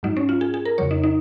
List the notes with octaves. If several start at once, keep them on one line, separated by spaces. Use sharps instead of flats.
G#2 F#3 D#4
C#4
F4
G#4
G#4
A#4
F2 C#3 F#3 C#5
D#4
D#4